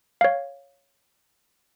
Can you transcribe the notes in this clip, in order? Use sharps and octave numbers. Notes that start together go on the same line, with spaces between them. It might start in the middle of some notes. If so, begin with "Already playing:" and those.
C#5 F5